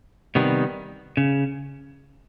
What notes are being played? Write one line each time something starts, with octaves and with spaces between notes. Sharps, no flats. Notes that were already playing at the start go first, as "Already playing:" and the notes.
C3 D#3 G3 B3
C#3